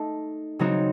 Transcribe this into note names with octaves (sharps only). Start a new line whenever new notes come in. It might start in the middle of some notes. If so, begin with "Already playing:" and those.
Already playing: A3 D#4 A4
C#3 F#3 C4 D#4 F#4